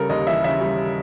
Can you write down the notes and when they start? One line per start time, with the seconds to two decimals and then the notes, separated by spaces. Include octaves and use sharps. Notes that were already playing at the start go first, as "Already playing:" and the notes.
Already playing: C#3 G3 A4 A#4
0.10 D#2 D#5
0.27 E3 E5
0.44 C#3 E5
0.61 G3